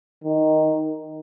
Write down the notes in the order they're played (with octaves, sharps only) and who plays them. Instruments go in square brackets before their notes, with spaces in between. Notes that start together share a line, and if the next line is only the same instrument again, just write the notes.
[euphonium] D#3